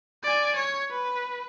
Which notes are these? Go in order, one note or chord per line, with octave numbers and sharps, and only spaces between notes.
D5 G#5
C#5
B4